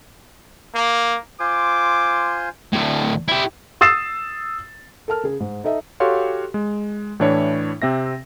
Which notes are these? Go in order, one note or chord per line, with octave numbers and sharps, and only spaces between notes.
A#3
F4 C5 G#5 D6
D2 A2
E4 G4
D#6 E6 A6 C7 E7
A4 A#4 A5 F6
C#3 G#4
G#2
D#4 A4 D#5 E5
F#4 G4 A4 C#5 F5 C6
G#3
A2 E3 D4 E4 C#5
C3 C4 E5 A#6